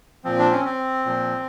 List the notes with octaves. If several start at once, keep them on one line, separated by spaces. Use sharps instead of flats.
A#2 F3 C4
D4
C#4
C4
A#2 F3